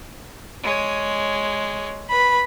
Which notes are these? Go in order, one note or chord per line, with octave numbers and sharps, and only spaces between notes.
G#3 C#5
B4 B5